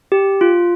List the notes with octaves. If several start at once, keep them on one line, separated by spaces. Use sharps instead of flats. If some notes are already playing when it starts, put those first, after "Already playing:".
G4
F4